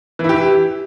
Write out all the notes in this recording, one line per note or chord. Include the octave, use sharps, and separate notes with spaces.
E3 E4 G4